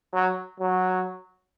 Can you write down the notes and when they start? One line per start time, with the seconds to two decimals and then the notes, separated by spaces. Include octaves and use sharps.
0.14 F#3
0.60 F#3